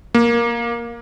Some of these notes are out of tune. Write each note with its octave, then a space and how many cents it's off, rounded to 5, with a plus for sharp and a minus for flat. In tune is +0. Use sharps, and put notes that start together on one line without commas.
A#3 +10